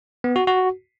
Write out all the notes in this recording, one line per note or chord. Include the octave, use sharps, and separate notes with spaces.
B3
F#4
F#4